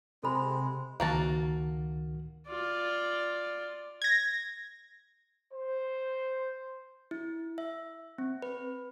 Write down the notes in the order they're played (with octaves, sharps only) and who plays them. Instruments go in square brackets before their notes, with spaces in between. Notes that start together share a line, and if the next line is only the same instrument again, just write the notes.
[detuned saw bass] C3 [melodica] G#3 [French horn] C4 [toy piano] A4 B5
[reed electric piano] C#2 D#3 [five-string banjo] A#3 F#4 A5
[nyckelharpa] F4 D5
[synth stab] G#6 A#6
[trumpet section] C5
[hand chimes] E4
E5
C4
B4